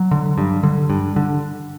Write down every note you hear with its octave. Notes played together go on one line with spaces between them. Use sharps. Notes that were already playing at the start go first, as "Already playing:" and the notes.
Already playing: F#3
D3
G2
D3
G2
D3